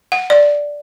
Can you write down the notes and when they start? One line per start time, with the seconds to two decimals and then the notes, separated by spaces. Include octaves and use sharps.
0.12 F#5
0.30 D5